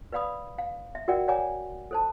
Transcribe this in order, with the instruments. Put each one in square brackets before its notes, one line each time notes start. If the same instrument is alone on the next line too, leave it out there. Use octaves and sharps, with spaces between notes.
[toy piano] B4 D5 F5 B5 D#6
F5
E5
F#4 A#4 D5 F#5 G5
C#5 D5 F#5 G#5 A#5 D6
A4 C5 A5